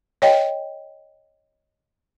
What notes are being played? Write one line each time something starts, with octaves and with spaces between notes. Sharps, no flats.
C#5 D#5 G5